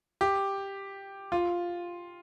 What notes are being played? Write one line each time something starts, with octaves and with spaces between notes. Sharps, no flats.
G4
F4